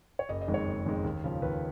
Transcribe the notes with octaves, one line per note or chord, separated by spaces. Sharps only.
C#5
F#1 D#5
D#5
F2 D#3 G#3
C#5
F#1
F2 D#3 G#3
D#2
C#3 F3
D#2 B4